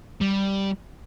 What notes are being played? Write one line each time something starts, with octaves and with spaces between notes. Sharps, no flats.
G3